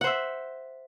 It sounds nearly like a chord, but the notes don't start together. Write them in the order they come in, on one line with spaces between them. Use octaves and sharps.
F#5 C5 E5